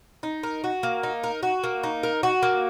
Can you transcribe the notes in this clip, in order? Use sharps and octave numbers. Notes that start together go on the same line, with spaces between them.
D#4
A#4
F#4
A#3
D#4
A#4
F#4
A#3
D#4
A#4
F#4
A#3